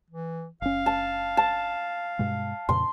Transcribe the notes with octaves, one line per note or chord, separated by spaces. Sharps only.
E3
F#1 C#4 F5
A5
A5
G2 B2 G#3
F2 A#2 C#3 C6